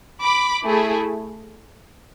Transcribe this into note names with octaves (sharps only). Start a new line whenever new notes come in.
B5 D6
A3 E4 G#4